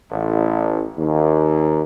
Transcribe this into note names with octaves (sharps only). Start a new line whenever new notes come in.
A1
D#2